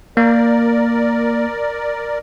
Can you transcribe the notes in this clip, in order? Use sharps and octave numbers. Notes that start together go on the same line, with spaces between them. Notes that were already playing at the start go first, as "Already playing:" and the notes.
A#3 A#4 D5